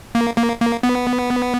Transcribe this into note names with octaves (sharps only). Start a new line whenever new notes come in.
A#3
A#3
A#3
B3